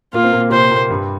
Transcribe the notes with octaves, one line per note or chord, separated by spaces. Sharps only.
A#2 A#3 F4
C4
A#2 A#3
C3 C4 C5
A#2 A#3
G2 G3